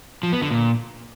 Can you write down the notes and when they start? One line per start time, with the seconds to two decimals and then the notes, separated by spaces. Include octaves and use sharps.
0.23 F3
0.32 B3
0.42 D3
0.51 A#2